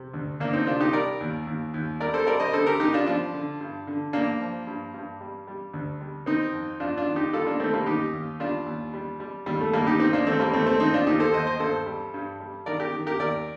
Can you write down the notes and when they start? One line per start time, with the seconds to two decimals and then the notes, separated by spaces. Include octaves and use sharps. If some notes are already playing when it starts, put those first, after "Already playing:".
Already playing: C3
0.13 D2
0.40 D2 A#3 D4
0.53 C4 D#4
0.67 C3 D4 F4
0.80 D#4 G4
0.93 G3 A#4 D5
1.21 D#2
1.47 D#2
1.74 D#2
2.00 G3 A#4 D5
2.14 A4 C5
2.27 G3 A#4 D5
2.40 C5 D#5
2.53 D3 A4 C5
2.66 G4 A#4
2.80 G3 D#4 G4
2.94 D4 F4
3.06 F3 D4 F4
3.34 D3
3.61 G2
3.87 D3
4.13 G2 A#3 D4
4.41 F3
4.67 G2
4.94 G2
5.21 G3
5.47 G3
5.73 D2
6.01 G3
6.26 D#3 C4 D#4
6.53 F2
6.80 F2 D4 F4
6.97 D4 F4
7.07 D#3
7.16 D#4 G4
7.33 G3 F4 A4
7.47 A#3 D4
7.60 D#3 A3 C4
7.74 G3 A#3
7.86 D#2 D#4 G4
8.13 D#2
8.40 G3 D4 F4
8.66 D#2
8.94 G3
9.20 G3
9.46 D#2 G3
9.61 A3
9.73 D#2 G3 A#3
9.87 D#4 G4
10.00 D#2 C4 D#4
10.13 A#3 D4
10.27 D#2 A3 C4
10.40 G3 A#3
10.53 D#2 A3 C4
10.67 A3 C4
10.80 D#2 C4 D#4
10.94 D4 F4
11.07 D#2 D#4 G4
11.20 A4 C5
11.33 D#2 C5 D#5
11.47 C5 D#5
11.60 G2 A4 C5
11.86 G3
12.14 G2
12.40 G3
12.66 D#3 A#4 D5
12.80 G4 A#4
12.93 D#3
13.06 G4 A#4
13.20 D#2 A#4 D5